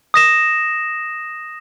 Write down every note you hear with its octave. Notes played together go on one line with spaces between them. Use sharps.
D#6 A#6 E7